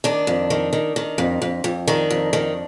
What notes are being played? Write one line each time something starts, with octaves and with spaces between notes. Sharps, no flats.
D#3 D4
F2
D#3
D#3
D#3
F2
F2
F2
D#3 D4
F2
D#3